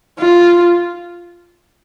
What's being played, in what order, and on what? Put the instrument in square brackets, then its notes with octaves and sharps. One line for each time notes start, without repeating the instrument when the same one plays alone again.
[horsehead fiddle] F4